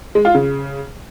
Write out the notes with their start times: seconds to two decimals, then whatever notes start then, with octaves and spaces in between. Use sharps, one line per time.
0.15 G#3
0.25 F4
0.35 C#3